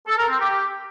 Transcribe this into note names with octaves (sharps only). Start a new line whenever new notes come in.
A4
A#4
C4
G4